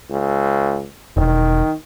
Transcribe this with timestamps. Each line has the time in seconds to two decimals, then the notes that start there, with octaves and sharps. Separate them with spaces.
0.10 C#2
1.17 E1 D#3